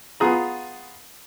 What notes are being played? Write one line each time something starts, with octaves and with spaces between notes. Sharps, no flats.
B3 F4 G#4 A#5